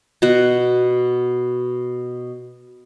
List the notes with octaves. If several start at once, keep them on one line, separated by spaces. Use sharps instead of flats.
B2 F#4